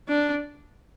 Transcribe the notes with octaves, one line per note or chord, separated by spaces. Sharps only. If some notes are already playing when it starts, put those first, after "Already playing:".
D4